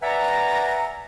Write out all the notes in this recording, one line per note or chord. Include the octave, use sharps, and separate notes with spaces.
B4 D5 E5 F#5 G#5 A#5